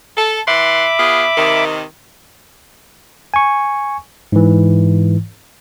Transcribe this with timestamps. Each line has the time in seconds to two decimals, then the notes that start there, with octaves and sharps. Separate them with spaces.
0.17 A4
0.48 E3 E5 F#5 B5 C6 D6
0.99 B3 F4 G#4
1.37 C3 D#3
3.34 G#5 C#6
4.32 G#2 E3